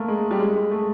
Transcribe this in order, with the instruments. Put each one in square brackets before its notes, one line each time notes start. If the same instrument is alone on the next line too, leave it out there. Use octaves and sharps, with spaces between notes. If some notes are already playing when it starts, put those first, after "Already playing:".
Already playing: [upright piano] A3 A#3
G#3
G3
G#3
G#3
A3